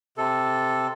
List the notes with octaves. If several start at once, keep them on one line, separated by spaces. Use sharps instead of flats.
C3 A4